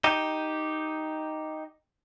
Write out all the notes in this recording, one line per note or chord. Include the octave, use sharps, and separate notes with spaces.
D#4 G4